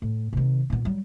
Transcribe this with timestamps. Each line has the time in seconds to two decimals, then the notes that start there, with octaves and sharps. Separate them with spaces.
0.02 A2
0.33 C3 D#3
0.70 A#2 B3
0.85 F#3 G3